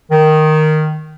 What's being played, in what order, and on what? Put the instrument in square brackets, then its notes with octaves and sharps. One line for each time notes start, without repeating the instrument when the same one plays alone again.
[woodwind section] D#3